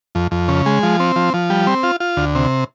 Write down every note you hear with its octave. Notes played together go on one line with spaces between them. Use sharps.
F2
F2
C#3
G#3
F3
C4
F3
F3
G3
C4
F4
F4
D2
C3